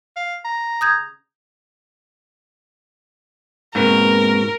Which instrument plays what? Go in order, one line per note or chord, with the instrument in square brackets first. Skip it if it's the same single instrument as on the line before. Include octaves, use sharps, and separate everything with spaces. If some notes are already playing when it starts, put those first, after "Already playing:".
[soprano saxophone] F5
A#5
[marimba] D#6 G6 G#6
[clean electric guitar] G#2 B2 [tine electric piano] A#3 C4 B4 [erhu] A#4